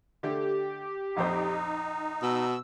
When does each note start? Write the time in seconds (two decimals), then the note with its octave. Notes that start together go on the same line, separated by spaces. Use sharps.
0.23 D3 A3 G4
1.17 A#1 F2 D#4 C5
2.22 B2 E6